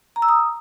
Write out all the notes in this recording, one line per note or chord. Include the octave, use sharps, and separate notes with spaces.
A#5
E6
D#6